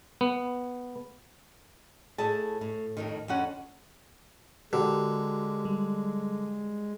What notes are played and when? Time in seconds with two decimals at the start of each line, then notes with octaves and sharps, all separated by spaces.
0.21 B3
2.18 A2 E4 G#4 A5
2.61 A2
2.97 F2 A2 D#3
3.28 F2 D3 C#4 F#5
4.73 D3 G#3 F#4 G4 A#4
5.65 G3